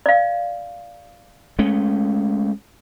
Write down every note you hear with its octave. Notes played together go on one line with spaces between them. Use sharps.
D5 F5
G#3 A3 C#4